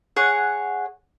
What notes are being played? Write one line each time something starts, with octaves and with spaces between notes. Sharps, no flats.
G#4 C#5 F#5